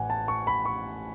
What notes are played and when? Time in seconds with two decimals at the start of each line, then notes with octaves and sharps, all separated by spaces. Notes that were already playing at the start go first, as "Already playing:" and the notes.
Already playing: A1 F#5 G#5
0.10 A5
0.28 C#6
0.47 B5
0.65 C#6